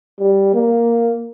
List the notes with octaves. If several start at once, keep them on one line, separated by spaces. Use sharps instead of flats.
G3
A#3